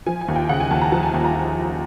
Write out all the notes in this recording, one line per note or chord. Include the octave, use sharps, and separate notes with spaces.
F3 G#5
G#5
D#2
G5
C#3 F#5
G#5
D#2 A5
A#5
F3 A5
G#5
D#2
A#5